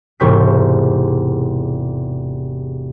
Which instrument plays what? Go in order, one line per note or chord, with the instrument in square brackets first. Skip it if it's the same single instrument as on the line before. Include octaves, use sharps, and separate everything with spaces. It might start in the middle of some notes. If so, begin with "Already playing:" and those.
[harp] E1 G#2 C3 C#6 G6 B6